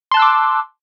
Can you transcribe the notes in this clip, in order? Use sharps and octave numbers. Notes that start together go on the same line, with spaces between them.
A5 C6 D6 E6 F#6